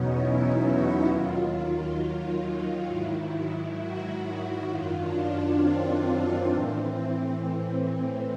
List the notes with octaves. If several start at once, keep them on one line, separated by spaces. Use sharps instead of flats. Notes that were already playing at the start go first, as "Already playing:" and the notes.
Already playing: E2 B2 F#3 B3 C#4 D#4
E4
F#4
D#2 D#3 F#3 F4
G#2 D#3 F#3 E4
F#4
F#4
F#2 D#3 F#3 F4
D4
D4
C4
A2 E3
C4